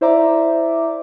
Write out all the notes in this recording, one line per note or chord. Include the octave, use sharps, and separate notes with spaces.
E4 C5 D5 E5 A#5 D6